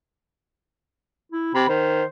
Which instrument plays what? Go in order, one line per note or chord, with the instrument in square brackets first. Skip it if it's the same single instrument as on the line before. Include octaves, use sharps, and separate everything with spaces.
[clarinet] E4
[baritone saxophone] C3 [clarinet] B5
[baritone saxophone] D#3 [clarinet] C5